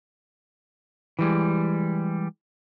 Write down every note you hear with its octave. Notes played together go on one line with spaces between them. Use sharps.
E3 G3 G#3